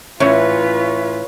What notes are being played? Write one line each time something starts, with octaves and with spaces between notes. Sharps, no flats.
A2 E3 C#4 F4 B4 C#5